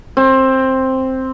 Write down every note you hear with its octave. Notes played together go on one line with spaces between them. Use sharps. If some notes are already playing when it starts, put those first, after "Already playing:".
C4